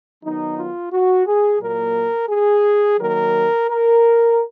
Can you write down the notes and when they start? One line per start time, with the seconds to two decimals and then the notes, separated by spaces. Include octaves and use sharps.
0.23 D#3 F#3 B3 D#4
0.57 F4
0.92 F#4
1.27 G#4
1.61 A#2 F#3 A#3 A#4
2.30 G#4
2.99 D#3 F#3 A#3 A#4
3.68 A#4